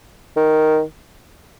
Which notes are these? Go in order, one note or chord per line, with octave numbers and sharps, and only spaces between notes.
D#3